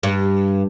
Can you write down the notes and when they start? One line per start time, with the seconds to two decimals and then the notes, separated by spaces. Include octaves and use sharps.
0.03 G2